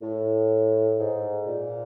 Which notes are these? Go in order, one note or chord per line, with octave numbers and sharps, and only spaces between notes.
A2
G#2
A#2